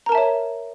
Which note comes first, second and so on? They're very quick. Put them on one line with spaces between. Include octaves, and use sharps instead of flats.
A#5 A#4 A5 E5 C#5